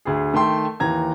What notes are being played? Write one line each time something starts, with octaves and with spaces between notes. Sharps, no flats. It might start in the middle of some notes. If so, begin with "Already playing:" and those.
D2 G#4
D#3 A3 G5 C6
D#2 E3 A#5 G#6